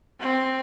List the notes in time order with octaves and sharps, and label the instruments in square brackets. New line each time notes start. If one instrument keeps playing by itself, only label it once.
[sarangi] C4